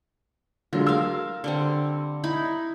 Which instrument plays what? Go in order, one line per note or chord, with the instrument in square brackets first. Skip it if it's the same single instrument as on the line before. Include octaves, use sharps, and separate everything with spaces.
[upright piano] D3 F#3 G#3 [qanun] F4
[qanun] A#4 F5 [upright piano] E6
[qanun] D3 G3 C4
D#4 E4 B5